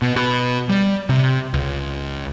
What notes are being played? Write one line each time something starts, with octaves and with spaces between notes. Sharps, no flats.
B2
B2
G3
C3
C#2